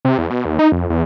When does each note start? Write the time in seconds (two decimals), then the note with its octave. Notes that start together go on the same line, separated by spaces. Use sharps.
0.05 C3
0.18 E2
0.30 B2
0.45 D#2
0.59 D#4
0.72 F2
0.90 E2